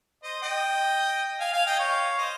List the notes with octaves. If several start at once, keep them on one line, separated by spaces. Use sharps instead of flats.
C5 D#5
D#5 G5
F5 G#5
F5 G#5
D#5 G5
C#5 F5
C5 D#5